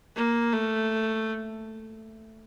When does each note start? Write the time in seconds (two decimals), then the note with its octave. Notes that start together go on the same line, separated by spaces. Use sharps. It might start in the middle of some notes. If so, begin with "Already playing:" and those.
0.16 A#3
0.53 A3